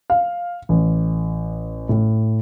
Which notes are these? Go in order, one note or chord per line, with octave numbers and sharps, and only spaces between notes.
F5
A1
A2